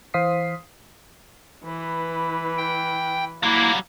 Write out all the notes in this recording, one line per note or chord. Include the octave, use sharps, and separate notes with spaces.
E3 C5 F5 D#6 B6 C7
E3 B4
G5
F#3 G3 A#3 E4